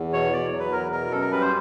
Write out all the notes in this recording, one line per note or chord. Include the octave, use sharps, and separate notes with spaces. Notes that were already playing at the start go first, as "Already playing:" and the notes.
Already playing: E2
B2 C#5
E2 D5
C#5
F#3
B4
E2 A#4
B2 A#4
F#2 A4
A#4
G3 B4
C5